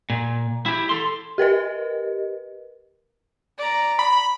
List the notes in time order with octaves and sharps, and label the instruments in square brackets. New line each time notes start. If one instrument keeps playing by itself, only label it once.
[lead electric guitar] A#2
E4 G4
A4 C6
[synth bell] G4 A#4 B4 D#5
[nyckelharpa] D5 A#5
[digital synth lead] B5